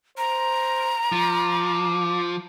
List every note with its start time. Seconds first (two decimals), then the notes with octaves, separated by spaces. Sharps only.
0.18 C5 A#5
1.12 F3 D6